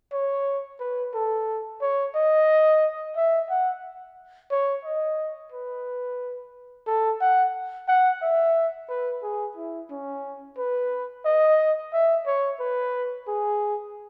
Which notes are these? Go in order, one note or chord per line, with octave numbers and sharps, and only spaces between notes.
C#5
B4
A4
C#5
D#5
E5
F#5
C#5
D#5
B4
A4
F#5
F#5
E5
B4
G#4
E4
C#4
B4
D#5
E5
C#5
B4
G#4